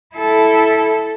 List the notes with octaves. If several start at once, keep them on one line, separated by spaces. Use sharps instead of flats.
E4 A4